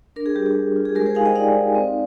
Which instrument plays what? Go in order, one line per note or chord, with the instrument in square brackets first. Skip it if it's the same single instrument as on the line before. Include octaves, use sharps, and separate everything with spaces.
[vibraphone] D4 A#4
G#4
G3 G4
G#4
G3
F4
G#4
G#3 G4 A#4
G#4 C5
D#4 F5 G#5
D#5 G5
D#4 D5 F5
D#4
C4